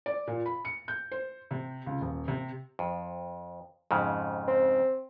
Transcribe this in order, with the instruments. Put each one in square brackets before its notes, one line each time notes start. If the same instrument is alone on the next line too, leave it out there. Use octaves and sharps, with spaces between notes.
[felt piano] D5
A#2
B5
C#7
G6
C5
C3
C#2
D#1
C3
[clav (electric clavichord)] F2
F2 G#2 C#3
[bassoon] C4